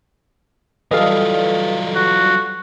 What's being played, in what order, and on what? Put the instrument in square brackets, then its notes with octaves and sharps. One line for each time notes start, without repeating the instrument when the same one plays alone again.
[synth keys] E3 G3 A4 [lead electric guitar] F#3 F4 [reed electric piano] D#5 F5
[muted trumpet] F#4